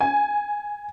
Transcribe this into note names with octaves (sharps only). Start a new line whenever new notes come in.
G#5